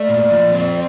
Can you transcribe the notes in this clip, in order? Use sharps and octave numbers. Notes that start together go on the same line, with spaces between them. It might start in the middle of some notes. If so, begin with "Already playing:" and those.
Already playing: A3 D5
A#2
F3
C4